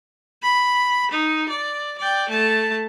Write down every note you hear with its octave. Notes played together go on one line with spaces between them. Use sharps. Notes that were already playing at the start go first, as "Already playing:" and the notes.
B5
D#4
D5
D5 G5
A3 A5